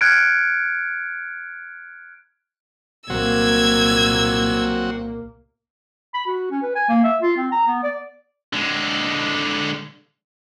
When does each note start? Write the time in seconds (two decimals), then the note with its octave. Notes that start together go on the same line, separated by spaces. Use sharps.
0.01 F6 F#6 G#6 C#7 D7
3.10 C2 A#2 F#3 A#3 C4 F#4 E6 G#6
6.14 B5
6.27 F#4
6.51 C#4
6.63 B4
6.75 G#5
6.89 A#3
7.04 E5
7.22 F4
7.37 C4
7.52 A#5
7.67 B3
7.83 D5
8.53 D3 G#3